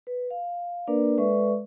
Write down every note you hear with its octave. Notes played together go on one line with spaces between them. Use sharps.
B4
F5
A#3 D4 A#4 B4 D5
G#3 A4 B4 D5 E5 C#6